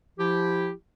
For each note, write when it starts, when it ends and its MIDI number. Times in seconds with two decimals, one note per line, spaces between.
0.19 0.71 53
0.19 0.71 64
0.19 0.71 67